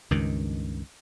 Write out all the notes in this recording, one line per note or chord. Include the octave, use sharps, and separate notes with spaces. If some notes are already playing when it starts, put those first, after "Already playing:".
C#2 G2 D#3